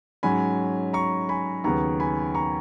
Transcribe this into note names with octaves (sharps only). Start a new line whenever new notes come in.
G#2 F#3 C#4 G#5 B5
A#5 C#6
G#5 B5
D#2 C#3 F#3 B3 A#5 C#6
G#5 B5
A#5 C#6